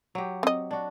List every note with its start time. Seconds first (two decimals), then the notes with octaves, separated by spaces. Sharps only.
0.15 F#3 G4
0.43 C4 D#5
0.71 D4 F#4